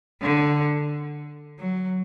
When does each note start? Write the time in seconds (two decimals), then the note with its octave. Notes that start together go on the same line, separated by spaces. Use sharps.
0.22 D3
1.60 F#3